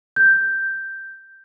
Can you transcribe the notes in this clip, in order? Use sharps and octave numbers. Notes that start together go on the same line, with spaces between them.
G6